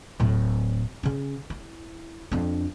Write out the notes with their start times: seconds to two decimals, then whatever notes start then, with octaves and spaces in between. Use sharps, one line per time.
0.20 D1 A2
1.03 C#3 C#4
1.50 E4
2.31 F2 D4